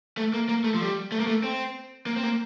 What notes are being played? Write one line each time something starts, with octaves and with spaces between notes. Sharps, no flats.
A3
A#3
A#3
A3
F3
G3
A3
A#3
A3
C4
A#3
C4
A#3